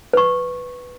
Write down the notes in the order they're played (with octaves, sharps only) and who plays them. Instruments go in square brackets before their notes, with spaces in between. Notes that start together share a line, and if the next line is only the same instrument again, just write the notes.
[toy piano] B4 C#6